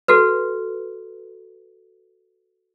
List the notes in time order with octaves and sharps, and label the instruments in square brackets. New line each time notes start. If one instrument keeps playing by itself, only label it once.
[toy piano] F#4 A4 B4